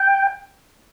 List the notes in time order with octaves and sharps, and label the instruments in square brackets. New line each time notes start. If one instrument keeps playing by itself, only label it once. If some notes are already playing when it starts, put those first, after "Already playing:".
Already playing: [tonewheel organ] G5